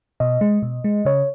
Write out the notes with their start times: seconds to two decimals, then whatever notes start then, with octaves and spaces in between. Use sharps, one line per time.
0.20 B2 D#5
0.41 G#3
0.62 B2
0.84 G#3
1.05 C#3 C#5